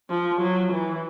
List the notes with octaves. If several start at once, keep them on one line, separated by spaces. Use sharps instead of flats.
F3
F#3
E3